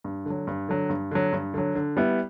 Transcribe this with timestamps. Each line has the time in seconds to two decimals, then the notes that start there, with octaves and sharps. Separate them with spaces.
0.04 G2
0.25 D3 F#3
0.47 G2
0.69 D3 F#3
0.89 G2
1.11 D3 F#3
1.33 G2
1.54 D3 F#3
1.75 D3
1.97 G3 B3 E4